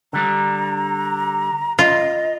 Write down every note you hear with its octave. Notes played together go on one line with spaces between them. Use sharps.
D3 G3 D4 A#5
F4 D#5